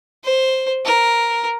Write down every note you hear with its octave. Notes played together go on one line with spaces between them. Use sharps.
C5
A#4